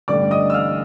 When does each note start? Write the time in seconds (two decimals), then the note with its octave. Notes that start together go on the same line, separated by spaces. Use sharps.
0.08 A1 G2 D3 G3 D5 D6
0.31 D#5 D#6
0.50 E6
0.54 F5 F6